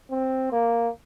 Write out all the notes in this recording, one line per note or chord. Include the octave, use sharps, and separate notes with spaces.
C4
A#3